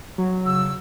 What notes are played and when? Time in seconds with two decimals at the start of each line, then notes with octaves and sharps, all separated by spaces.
0.18 F#3
0.45 C#3 E6